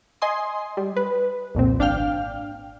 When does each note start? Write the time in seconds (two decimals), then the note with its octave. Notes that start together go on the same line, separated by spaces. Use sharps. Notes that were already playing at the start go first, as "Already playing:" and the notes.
0.22 D#5 G#5 C6 D#6
0.77 G3
0.97 B4
1.55 C2 F2 A#2 C4
1.79 G#1 D4 F5 G5 F6